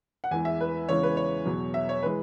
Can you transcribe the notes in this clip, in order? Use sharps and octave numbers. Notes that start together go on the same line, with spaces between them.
F#5
E2 E3 G#3 G#5
E5
B4
E2 C#3 E3 G#3 C#5
B4
C#5
E2 B2 F#3
E5
C#5
E3 G#3 B4